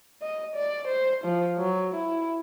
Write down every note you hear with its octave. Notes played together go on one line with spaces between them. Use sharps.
D#5
D5
C5
F3
F#3
E4